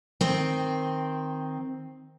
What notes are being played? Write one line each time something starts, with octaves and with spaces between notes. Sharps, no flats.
D#3 C4